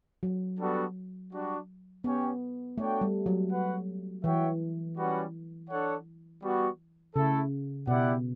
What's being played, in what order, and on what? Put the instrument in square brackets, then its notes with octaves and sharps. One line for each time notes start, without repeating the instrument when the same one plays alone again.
[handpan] F#3
[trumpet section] G3 B3 D4 F#4 A4
G3 D4 F#4
[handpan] B3 [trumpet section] C#4 G4 C#5 G5
[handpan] A3 [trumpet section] D4 F#4 C#5 G5
[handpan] G3
F#3
[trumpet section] F#4 B4 F#5
[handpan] E3 [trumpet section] F#4 C#5 E5 G5
[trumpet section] G3 C#4 F#4 B4 F#5
D4 A4 C#5 F#5
G3 B3 F#4
[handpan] C#3 [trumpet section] A3 E4 A4
[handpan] B2 [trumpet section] E4 G4 D5 F#5